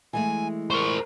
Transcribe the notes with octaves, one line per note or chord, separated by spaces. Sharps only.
E3 G#3 A3 G#5
A#4 C5 C#6